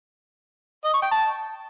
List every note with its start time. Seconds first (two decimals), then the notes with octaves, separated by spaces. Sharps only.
0.85 D#5
0.94 C#6
1.03 G5
1.12 A5